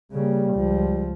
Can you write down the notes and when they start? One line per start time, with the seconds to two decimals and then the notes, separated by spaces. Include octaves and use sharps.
0.12 C#3 G3 A#3
0.54 C#2 F3